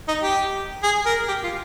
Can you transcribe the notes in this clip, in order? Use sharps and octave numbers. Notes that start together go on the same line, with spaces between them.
D#4
G4
G#4
A#4
G4
F4